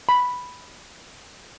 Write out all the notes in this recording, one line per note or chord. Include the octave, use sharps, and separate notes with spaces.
B5